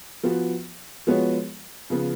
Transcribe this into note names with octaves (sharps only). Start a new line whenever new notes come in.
F3 B3 F#4
F3 G#3 B3 F#4 C#5
C#3 F3 B3